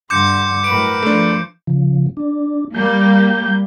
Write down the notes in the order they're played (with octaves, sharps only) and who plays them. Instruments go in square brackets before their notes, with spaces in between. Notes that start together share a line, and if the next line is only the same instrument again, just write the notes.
[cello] G2 D3 [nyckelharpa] C6 [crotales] D6 G6 C#7
[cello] A2 F#3 [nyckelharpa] A#4 B4 [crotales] D7
[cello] F3 C5 [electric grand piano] A3 D4
[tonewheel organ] C#3 F3
D4
[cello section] G3 A#3 [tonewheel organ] G6